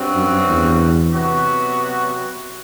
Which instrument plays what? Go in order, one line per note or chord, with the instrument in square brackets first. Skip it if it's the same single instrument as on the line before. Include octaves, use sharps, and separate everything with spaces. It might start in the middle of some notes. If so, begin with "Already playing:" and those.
Already playing: [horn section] G2 F#3 C4 F#4
[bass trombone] F#2
E2
[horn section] C3 F#3 B3 F#4